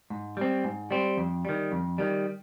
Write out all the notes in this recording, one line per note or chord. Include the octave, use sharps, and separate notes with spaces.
G#2
G3 C4
G#2
G3 C4
F2
D#3 G3
F2
D#3 G3